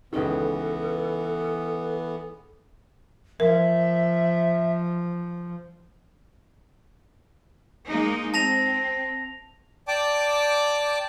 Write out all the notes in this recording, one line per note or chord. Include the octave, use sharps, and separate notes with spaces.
C#2 D#3 E3 B3 A4
F3 A#4 E5
G#3 A#3 D#4
C4 A5 A#6 F7
D5 G5 A5 D6